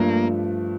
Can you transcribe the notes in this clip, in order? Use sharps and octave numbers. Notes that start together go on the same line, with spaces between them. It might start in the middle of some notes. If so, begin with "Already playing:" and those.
Already playing: G2 F3 A3 A#3 D4